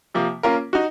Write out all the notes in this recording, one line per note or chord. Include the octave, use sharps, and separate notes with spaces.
C3 F3 A#3
A#3 C#4 F4 A#4
D#4 F#4